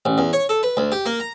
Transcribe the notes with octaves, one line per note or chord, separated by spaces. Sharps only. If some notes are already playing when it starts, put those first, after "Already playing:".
A1
E2
C#5
A4
B4
D2
G4
A#3
A#5